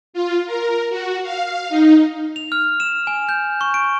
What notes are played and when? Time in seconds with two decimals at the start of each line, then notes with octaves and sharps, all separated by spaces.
0.14 F4
0.46 A#4
0.90 F#4
1.23 F5
1.69 D#4
2.36 F7
2.52 F6
2.80 E7
3.07 G#5
3.29 G6
3.61 C#6
3.74 D7